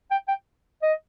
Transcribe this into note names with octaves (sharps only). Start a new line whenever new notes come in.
G5
G5
D#5